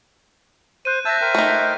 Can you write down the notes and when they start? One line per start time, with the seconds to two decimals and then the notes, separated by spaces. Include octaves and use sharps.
0.85 C5 F#6 D#7
1.05 E5 A5 E6 G6 A#6
1.21 A#4 C5 G5
1.35 A3 D#4